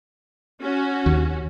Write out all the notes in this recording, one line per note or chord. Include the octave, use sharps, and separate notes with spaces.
C#4 F#4
D#2